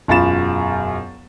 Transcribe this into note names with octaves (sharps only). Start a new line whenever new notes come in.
E1 F#2 F4 B5 A6 E7